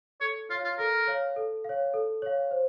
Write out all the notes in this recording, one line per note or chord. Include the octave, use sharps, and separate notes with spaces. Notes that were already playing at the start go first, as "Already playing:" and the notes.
A4 C#5
F4 C#5 F5
F4
A4 A#4
C#5 F5
A4
C#5 F5
A4
C#5 F5
C5